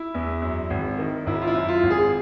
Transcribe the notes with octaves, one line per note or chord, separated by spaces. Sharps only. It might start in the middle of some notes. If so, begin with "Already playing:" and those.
Already playing: E4
E2
F#2
G#1
D#3
G#1 E4
F4
E4
F#2
F4
G#1
G#4